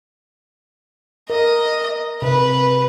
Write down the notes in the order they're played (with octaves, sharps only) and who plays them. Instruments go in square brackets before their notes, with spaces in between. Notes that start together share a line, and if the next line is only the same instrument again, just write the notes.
[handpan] A#4 [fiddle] D#5
[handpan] C3 [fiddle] B4